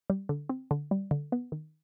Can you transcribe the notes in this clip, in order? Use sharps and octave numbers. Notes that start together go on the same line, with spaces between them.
G3
D3
C4
D3
G3
D3
B3
D#3